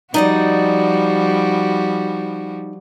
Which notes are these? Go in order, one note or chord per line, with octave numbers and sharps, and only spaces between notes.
F3 G3 D#4 F#4 D5 D#5